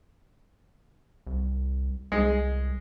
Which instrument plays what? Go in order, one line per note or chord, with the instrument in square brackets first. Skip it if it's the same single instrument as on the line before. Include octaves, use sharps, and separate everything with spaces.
[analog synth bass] C2
[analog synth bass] C2 [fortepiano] G#3